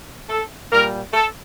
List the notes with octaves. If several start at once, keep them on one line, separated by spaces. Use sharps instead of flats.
A4
A#2 G3 A#4
A4